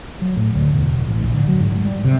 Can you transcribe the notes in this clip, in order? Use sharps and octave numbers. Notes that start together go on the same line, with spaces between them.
F#3
A2
D2
E1
A1
A#1
D3
F#3
G#2
G3
C3